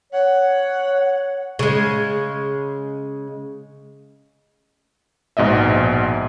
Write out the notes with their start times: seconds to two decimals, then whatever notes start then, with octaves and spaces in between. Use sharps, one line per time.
0.13 C#5 F#5
1.59 C#3 G#3
5.37 A#1 G#2 B2 D#5 E5